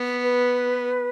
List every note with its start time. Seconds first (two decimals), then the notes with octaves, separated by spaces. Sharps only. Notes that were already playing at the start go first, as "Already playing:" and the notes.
Already playing: B3
0.23 B4